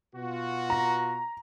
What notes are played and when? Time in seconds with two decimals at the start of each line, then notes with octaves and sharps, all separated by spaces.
0.15 B2 F4 F#4
0.70 A#5